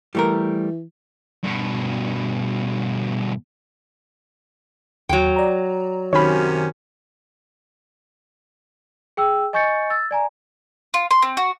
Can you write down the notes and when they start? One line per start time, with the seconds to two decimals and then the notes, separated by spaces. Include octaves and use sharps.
0.15 E3 G3 A3 A#4
1.43 G2 B2
5.09 D#2 F#3 G5
5.36 D5 A#5
6.13 F#2 C3 D#3 C#4 C#5 B5
9.17 G#4 G5 E6
9.53 D#5 G#5 C#6 G6 A6 C#7
9.90 E6 A6
10.11 D5 G#5 A#5
10.94 F4
11.11 C6
11.22 C4
11.37 F#4